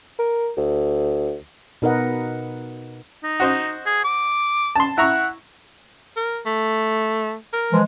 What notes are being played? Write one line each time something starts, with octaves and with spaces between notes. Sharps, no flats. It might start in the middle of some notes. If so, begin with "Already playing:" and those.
A#4
D2
B2 D#4 A#4 B4 D#5 F#5
D#4
F#4 C5 D#5
G#4
D6
A5 C6
E4 F#5 A#5 C#6
A#4
A3
A#4
E3 F3 G#3